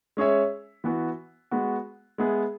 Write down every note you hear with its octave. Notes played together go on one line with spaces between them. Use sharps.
G#3 C#4 G#4 C#5 E5
E3 B3 F#4
G#3 B3 F#4
G#3 B3 G#4 E5